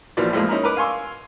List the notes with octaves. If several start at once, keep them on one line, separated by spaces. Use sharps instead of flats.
A#1 B2 E3 F3 D5
A2 F3 G#3 A#3
C#4 D#4 E4 A#4
A#4 B4 D6
F5 G#5 C6 C#6 E6